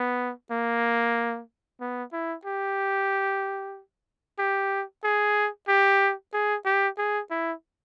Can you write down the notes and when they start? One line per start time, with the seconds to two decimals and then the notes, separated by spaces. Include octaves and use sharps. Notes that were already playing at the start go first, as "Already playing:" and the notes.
Already playing: B3
0.51 A#3
1.81 B3
2.13 E4
2.45 G4
4.39 G4
5.04 G#4
5.68 G4
6.34 G#4
6.66 G4
6.98 G#4
7.30 E4